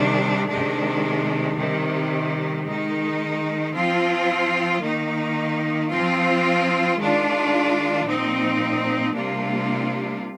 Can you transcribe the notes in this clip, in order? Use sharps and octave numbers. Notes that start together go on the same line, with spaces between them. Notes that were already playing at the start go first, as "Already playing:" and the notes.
Already playing: C3 D#3 G3 D4
C3 D#3 G#3 D4
C3 D#3 G3
D#3 G#3 D#4
F3 C4 F4
D#3 A#3 D#4
F3 C4 F4
D#3 G#3 D4 F4
A#2 F3 C4 D#4
C3 G3 A#3 D4 F4